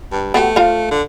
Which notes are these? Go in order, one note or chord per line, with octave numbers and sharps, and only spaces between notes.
G2
A3 B3 F#4 G4
F4 C5 F5
D3